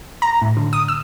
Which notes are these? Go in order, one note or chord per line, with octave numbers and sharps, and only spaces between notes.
A#5
A2
D3
D#6
E6